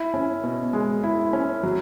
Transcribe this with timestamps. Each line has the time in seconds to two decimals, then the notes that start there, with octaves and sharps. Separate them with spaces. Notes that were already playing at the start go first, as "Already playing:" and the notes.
Already playing: E4
0.14 C#4
0.44 B2
0.73 G#3
1.03 E4
1.33 C#4
1.63 F#3